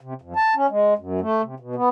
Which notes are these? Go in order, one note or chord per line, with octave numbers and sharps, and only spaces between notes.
C3
F2
A5
C#4
G#3
F#2
A3
C3
B2
B3